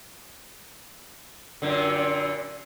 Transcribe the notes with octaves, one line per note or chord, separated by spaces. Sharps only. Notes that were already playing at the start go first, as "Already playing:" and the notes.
F#2 A#2 D3